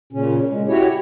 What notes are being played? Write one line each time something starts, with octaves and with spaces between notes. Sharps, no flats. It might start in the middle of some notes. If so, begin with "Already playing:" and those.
A#2 C#3 C#4
G#3
E4 F#4 G4 C#5